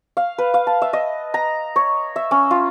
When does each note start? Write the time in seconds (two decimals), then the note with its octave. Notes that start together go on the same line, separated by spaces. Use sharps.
0.17 F5
0.38 B4
0.54 F5
0.67 A5
0.82 E5
0.93 D#5
1.34 A#5
1.76 C#5
2.16 E5
2.31 C#4
2.51 F4